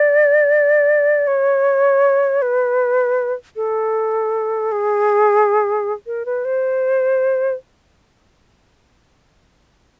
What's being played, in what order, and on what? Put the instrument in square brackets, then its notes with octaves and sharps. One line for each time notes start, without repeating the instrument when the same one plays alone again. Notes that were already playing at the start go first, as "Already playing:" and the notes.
Already playing: [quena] D5
C#5
B4
A4
G#4
A#4
B4
C5